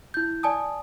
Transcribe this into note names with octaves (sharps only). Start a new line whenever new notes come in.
E4 G6
D5 G#5 A5 D#6